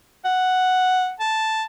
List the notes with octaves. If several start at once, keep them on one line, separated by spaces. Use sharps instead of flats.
F#5
A5